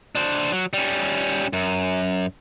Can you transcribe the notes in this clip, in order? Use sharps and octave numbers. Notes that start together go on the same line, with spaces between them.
D4 C5
F#3
G3 C#4
F#2